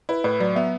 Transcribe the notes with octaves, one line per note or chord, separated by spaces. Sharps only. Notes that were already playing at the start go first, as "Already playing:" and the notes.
E4 B4
A2 B4
F#3 D5
B3 E5